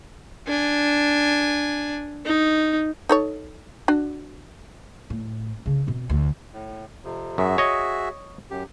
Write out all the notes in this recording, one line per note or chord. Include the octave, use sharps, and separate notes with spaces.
D4 G#5
D#4
D#4 A4 C#5
D4 F#4
A2
C#3 D4
B2 C4
D2
A2
F2 C3
F#2 F#4 G#4 E5
C#5 D#5
F#2 G4